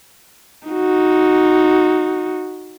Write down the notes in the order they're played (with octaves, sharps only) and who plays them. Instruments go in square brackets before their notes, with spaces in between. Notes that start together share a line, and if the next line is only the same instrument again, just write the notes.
[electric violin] D#4 F#4